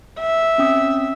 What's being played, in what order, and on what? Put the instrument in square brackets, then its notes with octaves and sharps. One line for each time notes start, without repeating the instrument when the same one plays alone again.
[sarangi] E5
[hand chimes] C4 C#4 D#6